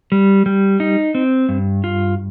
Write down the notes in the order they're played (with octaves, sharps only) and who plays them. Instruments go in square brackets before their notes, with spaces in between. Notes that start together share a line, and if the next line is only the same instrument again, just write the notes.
[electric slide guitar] G3
G3
D#4
C4
G2
F4